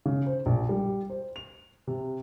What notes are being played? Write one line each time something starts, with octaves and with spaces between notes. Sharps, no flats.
C#3
C5
A#1
G3
C5
F7
C3